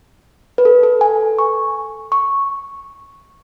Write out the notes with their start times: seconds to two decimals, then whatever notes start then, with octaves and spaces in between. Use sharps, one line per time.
0.58 B4
0.65 A4
0.83 A4
1.01 G#5
1.39 C#6
2.12 C#6